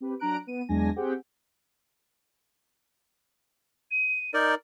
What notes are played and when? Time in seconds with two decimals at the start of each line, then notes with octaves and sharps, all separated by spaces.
0.01 C4 G4 B4
0.20 F#3 D4 A#5 F#6 D7
0.47 B3 D#7
0.69 E2 F#3 G#3 D4 G#5 A#6
0.96 C4 G4 G#4 F#5 G5
3.91 D#7
4.34 D#4 A#4 D5 G6